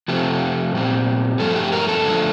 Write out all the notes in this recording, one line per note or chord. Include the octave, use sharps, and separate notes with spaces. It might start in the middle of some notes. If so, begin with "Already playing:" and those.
C3 F3 A3 C4 G4
A#2 G3 C4
G2 F3 A3 A4
G4
A#4
A4
D3 F3 A3